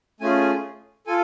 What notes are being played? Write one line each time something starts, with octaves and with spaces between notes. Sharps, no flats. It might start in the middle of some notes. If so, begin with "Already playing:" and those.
A3 C#4 F4 G#4 G#5
F4 A4 G#5